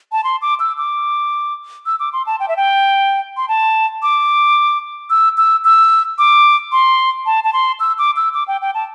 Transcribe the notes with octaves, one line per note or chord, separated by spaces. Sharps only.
A5
C6
D6
E6
D6
E6
D6
C6
A5
G5
E5
G5
C6
A5
D6
E6
E6
E6
D6
C6
A5
A5
C6
E6
D6
E6
D6
G5
G5
A5